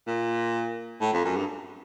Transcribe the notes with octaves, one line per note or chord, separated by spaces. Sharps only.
A#2
A2
F2
F#2
G2